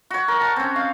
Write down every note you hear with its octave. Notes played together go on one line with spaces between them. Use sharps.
F#4 C#5
A#4
A5
C4 C#4
F5